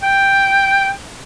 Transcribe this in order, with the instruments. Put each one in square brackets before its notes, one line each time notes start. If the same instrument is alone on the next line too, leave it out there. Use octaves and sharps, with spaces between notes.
[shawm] G5